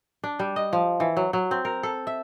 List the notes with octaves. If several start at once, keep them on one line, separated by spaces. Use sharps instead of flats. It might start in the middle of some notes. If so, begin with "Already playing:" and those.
D4
G3
D#5
F3
E3
F#3
F#3
C4
A#4
A4
E5